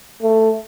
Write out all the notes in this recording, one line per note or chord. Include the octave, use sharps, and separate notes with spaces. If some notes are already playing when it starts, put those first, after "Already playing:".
A3